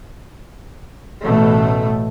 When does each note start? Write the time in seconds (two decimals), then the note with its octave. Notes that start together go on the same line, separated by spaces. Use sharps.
1.22 A1 B2 A3